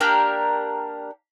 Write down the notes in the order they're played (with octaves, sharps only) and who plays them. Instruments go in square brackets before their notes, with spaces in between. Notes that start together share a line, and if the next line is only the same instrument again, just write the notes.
[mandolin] A#3 D4 G4 A#4